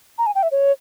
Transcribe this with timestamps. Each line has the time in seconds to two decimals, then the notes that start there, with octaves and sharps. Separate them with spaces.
0.18 A#5
0.26 G#5
0.35 G5
0.43 E5
0.51 C#5